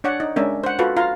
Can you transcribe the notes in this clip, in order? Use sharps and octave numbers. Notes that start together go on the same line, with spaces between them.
D4 C#5 D5 F#5
D#4
G#3 C#4 D4 A#4 E5
C5 F#5
F4 F#4 A4 B4
F4 F5 A#5